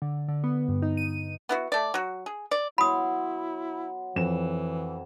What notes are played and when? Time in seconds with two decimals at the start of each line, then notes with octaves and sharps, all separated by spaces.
0.02 D3
0.28 D3
0.44 B3
0.68 G2
0.82 D#4
0.97 D#7
1.49 B3 E4 F#4
1.72 A3 D5
1.94 F#3 F#4
2.26 G#4
2.51 D5
2.78 F#3 B3 E4 B5 C6 D#6
4.16 F2 E3 E7